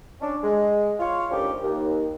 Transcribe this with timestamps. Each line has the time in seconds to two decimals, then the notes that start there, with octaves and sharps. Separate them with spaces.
0.21 C#4 D4
0.43 G#3
1.00 F4 C#5
1.31 D2 D#3 F3 G3 C#4 G4
1.63 D#2